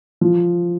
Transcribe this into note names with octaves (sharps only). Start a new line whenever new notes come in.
F3